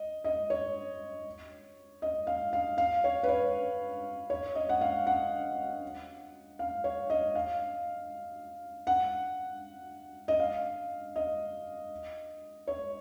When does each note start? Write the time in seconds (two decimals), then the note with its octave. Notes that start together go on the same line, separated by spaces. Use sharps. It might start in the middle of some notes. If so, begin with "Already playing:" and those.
Already playing: D#5
0.24 D#5
0.50 C#5
2.02 D#5
2.27 F5
2.53 F5
2.78 F5
3.04 C#5
3.23 B4
3.28 C#5
4.30 C#5
4.55 D#5
4.69 F#5
4.81 F5
5.07 F#5
6.59 F5
6.84 C#5
7.10 D#5
7.35 F5
8.87 F#5
10.28 D#5
10.40 F5
11.16 D#5
12.67 C#5